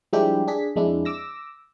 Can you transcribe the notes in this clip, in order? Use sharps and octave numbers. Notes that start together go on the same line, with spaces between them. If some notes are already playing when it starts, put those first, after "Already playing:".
F3 G3 G#3 D4 E4 G4
D4 G#4 B6
F2 G#3 D4 E4
D6 E6 A#6